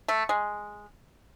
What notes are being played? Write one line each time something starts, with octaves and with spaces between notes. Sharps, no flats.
A3
G#3